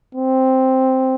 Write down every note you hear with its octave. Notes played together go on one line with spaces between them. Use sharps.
C4